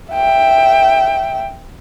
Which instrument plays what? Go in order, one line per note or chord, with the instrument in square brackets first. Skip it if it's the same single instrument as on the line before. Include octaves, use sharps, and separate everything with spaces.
[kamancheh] E5 G5